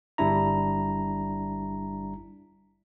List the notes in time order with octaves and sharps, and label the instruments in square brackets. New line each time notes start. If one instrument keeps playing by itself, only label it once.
[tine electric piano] G1 G3 D4 E4 A#5